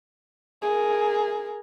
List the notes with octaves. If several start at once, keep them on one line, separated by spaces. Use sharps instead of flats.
G#4 A#4